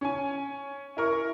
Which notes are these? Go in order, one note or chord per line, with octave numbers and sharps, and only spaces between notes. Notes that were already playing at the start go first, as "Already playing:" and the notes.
C#4 G#5
E4 A#4 C#6